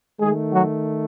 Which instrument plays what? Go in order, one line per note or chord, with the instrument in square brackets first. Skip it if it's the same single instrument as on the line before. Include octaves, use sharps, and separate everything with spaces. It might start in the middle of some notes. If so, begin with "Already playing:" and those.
[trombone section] D#3 G#3 A3 G#4
F#3 F#4